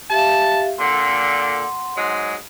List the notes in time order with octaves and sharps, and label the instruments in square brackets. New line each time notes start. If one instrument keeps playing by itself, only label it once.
[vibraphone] G4 E5 F5 [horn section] A5
[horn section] A#2 D3 [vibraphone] F#5 C6
[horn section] G#2 F#3 G#3